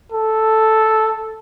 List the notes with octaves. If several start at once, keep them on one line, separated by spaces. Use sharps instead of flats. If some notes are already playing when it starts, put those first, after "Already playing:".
A4